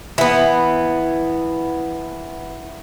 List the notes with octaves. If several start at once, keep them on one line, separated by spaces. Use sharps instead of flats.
E3 B3